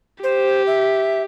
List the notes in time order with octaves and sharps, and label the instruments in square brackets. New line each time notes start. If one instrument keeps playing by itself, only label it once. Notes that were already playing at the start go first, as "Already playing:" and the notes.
[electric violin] G4 [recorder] C5
[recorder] E5